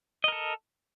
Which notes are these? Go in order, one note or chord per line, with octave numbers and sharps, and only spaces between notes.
A4 A#4 D#5